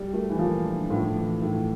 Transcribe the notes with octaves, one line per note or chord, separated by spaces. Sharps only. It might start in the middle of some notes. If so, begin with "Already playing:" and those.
Already playing: G3 G4
A3
E3
A#2 F3
D4
A2 F3
E3
A2